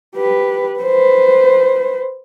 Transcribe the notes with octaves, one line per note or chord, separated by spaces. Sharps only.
G4 B4
B4 C5